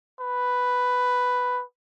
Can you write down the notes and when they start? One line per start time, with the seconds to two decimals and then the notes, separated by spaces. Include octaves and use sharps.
0.20 B4